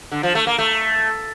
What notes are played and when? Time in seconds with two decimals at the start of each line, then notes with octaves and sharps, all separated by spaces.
0.12 D3
0.23 F3
0.35 A3
0.47 A#3
0.58 A3